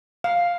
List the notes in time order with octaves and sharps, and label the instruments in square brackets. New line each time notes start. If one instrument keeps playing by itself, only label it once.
[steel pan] F5